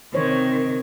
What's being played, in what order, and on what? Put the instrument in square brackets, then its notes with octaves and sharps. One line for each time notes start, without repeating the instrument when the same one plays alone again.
[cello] C3 D#3 [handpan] C5 C#5